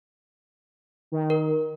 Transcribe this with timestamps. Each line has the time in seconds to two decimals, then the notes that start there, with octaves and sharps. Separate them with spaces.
1.12 D#3
1.30 A#4